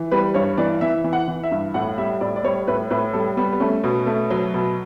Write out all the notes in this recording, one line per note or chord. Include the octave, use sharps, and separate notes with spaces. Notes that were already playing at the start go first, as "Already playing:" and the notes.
Already playing: E3
G3 B4
G2 C#5
E3 D5
E3 E5
E3
F#5
E3
E5
G2
A2 F#5
G3 E5
A2 D5
D5
G3 C#5
A2 B4
A2 B4
G3 A4
G3 B3
B3
A3 C#4
B2
A3
F#3
B2